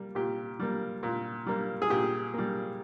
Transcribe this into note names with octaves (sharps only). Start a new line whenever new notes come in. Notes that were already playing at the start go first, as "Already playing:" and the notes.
Already playing: G3 A#3
A#2 G4
G3 A#3
A#2
G3 A#3
G#4
A#2 G4
G3 A#3